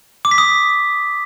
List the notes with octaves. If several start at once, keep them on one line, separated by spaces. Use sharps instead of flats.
D6
B6
D#6